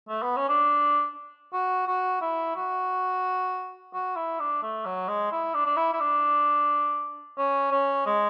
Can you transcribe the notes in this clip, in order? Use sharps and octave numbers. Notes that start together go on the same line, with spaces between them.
A3
B3
C#4
D4
F#4
F#4
E4
F#4
F#4
E4
D4
A3
F#3
G#3
E4
D4
D4
E4
E4
D4
C#4
C#4
G#3